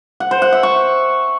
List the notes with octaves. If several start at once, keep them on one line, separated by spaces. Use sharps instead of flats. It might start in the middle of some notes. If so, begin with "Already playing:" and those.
F#5
C5
F#5
E5
C#6